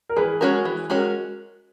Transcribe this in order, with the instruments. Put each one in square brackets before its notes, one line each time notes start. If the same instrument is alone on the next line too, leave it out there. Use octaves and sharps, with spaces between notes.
[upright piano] A#4
[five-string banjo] E3 [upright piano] G#4 B4
[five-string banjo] G#3 C#4 F#4 A#4
E3
G#3 C#4 F#4 A#4